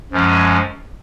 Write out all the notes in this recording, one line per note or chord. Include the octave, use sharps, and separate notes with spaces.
F#2 F3 G#3 C#4